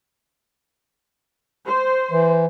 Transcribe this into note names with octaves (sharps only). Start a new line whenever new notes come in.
C5
E3